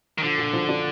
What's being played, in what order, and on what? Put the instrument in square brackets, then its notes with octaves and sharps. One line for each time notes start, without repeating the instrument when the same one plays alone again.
[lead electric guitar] D#3
[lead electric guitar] D3 [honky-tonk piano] F3
[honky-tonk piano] A#2
F3
D4